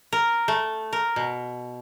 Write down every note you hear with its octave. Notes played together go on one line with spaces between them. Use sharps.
A#4
A3
A#4
B2